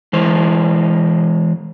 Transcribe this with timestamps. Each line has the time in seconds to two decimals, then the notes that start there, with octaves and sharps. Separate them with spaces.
0.13 E3 G#3 C5